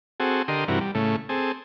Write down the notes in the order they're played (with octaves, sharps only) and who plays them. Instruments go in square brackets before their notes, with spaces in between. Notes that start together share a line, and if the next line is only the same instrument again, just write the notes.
[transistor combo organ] C4 F#4 G#4 A4
D3 G4 A#4 D#5 C6
G2 C3 E3 F#4 A#4
G3
A2 C#3 A3
C4 G#4 A4